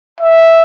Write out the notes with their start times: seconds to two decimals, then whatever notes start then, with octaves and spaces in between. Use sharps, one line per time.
0.20 E5